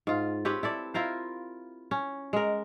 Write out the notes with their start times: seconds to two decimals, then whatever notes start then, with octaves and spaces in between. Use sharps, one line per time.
0.07 G#2 F4
0.45 C4 G4 B4 C#5
0.63 E4 A4 D5
0.94 E4 F4 A#4 C5
1.91 C#4
2.33 G#3 A#4